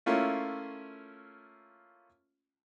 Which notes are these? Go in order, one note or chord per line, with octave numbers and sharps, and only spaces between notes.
A3 A#3 C#4 E4 F4